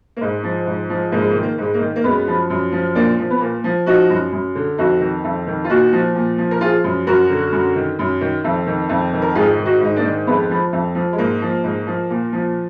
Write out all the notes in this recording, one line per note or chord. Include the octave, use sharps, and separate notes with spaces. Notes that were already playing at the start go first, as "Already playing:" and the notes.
A#3
G#2 G#3
F3
G#2
F3
G#2 A#3
G#3
A#3
D#3
A#3
G#2 G#3
A#3
D#3
A#3
F#2 G#3 B3
F3
F#2
F3
A#2 A#3 D4
F3
B3
A#2 A#3
F3
F3 D#4 F#4
F#2
F#2
D3
F2 D#4 F#4
D#3
F2
D#3
F4
A#2 D#4 F#4
F3
A#2
F3
A#4
F3 F4 G#4
F#2
F#2 F#4 A#4
D3
F#2
D#3
F#2
D#3
F2
D#3
F2
D#3
A#4
G#2 F4 G#4
D#3
D#4 F#4
G#2 D#4
A#3 D4
D#3
F2 G#3 B3
F3
F2
F3
G#3
G#2 A#3
F3
G#2
F3
A#2
F3